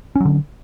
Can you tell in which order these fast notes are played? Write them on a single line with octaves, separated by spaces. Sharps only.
C#4 F#3 D3